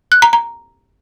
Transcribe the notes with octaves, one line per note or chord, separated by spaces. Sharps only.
F#6
A#5
A#5